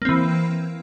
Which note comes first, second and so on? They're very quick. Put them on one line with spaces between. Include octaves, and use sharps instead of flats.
A#3 C4 E3